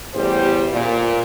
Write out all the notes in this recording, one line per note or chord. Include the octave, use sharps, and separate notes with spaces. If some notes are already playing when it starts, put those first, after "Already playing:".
A1 E2 G3 G4 C5
A#2